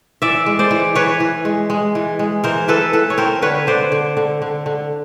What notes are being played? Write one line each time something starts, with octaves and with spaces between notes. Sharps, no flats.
E3 D5 E5
G#3
C5 D5
E3
E3 B4 C#5
E3
G#3
G#3
E3
G#3
E3 A#4 C5
E3 A4 B4
E3 A4 B4
C#5
C4 A#4 C5
D3 B4 C#5
D3 C5 D5
D3
D3
D3
D3